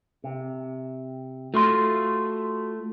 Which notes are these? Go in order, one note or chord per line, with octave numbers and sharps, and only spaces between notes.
C3
A3 F4 F#4 C6